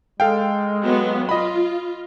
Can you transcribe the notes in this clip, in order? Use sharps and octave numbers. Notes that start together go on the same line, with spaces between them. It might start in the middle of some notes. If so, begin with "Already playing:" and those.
G#3 A4 F5 G5
F#3 B3
F4 D#5 B5